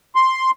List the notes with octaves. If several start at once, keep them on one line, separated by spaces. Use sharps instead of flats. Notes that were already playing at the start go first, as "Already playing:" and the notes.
C6